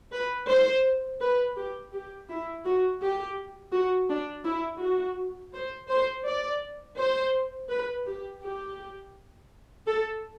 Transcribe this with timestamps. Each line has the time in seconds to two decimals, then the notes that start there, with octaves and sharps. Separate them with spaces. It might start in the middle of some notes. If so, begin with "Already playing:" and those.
0.12 B4
0.48 C5
1.21 B4
1.57 G4
1.93 G4
2.29 E4
2.65 F#4
3.01 G4
3.73 F#4
4.09 D4
4.45 E4
4.81 F#4
5.53 C5
5.90 C5
6.26 D5
6.98 C5
7.70 B4
8.06 G4
8.42 G4
9.86 A4